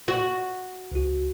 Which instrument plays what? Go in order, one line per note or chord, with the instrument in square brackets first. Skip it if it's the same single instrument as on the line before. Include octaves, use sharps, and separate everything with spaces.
[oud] F#4
[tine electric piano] C#2 F#4